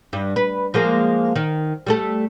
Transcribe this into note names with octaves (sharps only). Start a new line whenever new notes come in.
G2
B4
F3 G#3 A#3
D#3
G3 A3 A4